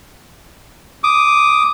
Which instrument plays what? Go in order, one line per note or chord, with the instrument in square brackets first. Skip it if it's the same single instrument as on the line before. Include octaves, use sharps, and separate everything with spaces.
[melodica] D6 D#6